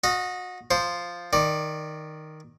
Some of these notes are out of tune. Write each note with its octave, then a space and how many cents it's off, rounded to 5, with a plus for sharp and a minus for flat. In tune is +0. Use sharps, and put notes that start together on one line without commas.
F#4 -30 D#5 +0
F3 +0 C5 +0
D#3 +0 D5 +15